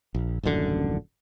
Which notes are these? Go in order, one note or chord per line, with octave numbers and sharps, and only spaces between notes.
A#1
D#1 A1 F#2 D3